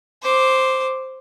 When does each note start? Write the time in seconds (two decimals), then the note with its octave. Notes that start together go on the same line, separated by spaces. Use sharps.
0.23 C5 D6